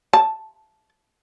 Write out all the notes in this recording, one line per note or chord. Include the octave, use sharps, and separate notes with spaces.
A5